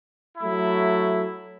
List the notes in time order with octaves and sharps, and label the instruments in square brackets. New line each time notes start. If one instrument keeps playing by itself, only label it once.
[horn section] F#3 A3 E4